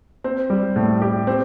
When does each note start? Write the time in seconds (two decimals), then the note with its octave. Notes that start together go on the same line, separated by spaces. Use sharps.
0.24 C4
0.50 G3
0.76 A2
1.02 G4
1.27 C4